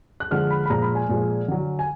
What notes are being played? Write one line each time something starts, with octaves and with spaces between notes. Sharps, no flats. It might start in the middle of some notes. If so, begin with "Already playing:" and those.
F#6
D3 F3 G#3 F6
B5
B5
A#2 F3 G#3 A#5
B5
G#5
A#2 F3 G#3
D3 F#3
G#5